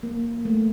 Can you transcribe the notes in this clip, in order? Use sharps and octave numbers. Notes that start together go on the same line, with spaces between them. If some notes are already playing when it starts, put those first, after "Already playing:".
A#3
A3